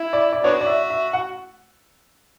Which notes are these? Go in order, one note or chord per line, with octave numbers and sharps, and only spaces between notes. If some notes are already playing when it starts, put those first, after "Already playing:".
Already playing: E4
D5
D5
B3 D4 F#4 C#5
D5
E5
E5
F#5